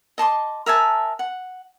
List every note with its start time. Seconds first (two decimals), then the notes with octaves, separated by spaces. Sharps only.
0.18 D#5 A5 C6 D6
0.66 A#4 E5 G#5 A5
1.19 F#5